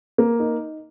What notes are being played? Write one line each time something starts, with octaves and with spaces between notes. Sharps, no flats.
A#3
D#4